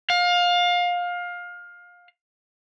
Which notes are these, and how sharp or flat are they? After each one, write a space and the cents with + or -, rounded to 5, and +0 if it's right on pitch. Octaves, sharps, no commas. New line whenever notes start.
F5 +20